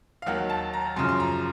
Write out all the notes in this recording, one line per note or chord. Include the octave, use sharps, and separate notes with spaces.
F5
D#2 D#3 F#3 F#5
A5
A#5
F#2 C#3 F3 C6
C6
A#5